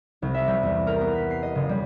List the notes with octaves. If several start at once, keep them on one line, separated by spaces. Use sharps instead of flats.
C2
E5
G3
E2
A#4
B3
B6
C7
D#5
F#1
G3